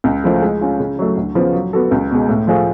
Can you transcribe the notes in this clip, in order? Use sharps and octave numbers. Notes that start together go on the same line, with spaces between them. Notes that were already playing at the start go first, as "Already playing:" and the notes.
C#2
C#3 F3 A3 F4
G#3
C#4 F4
C#3
F#3 A3
D2
C#3 F3 B3 F4
F#3
B3 F#4 A4
C#2
B2 G#3
A2
F3 A3 F4 G#4